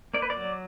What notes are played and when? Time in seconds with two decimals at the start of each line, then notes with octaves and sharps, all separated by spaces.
0.14 A#3 D5
0.22 B4
0.30 D5
0.36 F#3